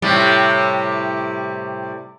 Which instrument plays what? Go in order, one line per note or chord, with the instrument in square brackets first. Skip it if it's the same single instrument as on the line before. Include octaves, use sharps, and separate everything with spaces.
[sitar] A2 C3 G3